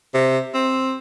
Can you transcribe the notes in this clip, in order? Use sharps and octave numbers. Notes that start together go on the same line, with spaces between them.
C3
C4